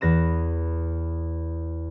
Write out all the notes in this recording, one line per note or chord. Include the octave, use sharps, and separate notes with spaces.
E2 B4 A#6 E7